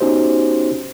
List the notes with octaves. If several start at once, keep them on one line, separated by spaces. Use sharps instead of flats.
B3 C#4 D#4 F#4 G4 C5